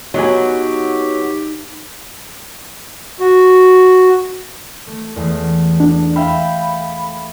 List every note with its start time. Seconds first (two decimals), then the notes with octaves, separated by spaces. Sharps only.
0.14 F#3 B3 D#4 G4 G#5
3.20 F#4
4.87 A3
5.16 E2 G#3 A3
5.80 D4
6.16 E5 F5 G5 B5